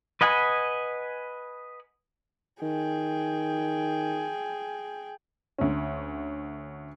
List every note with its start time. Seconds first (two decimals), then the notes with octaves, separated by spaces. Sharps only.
0.21 B4 D#5 F#5 G#5 B5
2.62 D#3 G#4 G5
5.58 D2 C#4